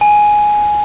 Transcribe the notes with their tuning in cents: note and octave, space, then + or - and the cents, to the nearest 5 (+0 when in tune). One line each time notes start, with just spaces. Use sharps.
G#5 +5